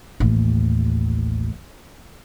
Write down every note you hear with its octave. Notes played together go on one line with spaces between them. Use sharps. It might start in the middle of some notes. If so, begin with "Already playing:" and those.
A1 D#2